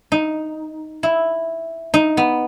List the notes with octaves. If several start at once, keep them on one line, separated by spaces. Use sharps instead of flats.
D#4
E4
D#4
B3